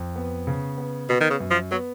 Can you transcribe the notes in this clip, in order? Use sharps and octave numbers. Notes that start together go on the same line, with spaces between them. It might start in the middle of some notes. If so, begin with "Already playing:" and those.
Already playing: F2
B3
C#3
B3
B2 B3
D#3
C#3
F#2
F3
F#3 B3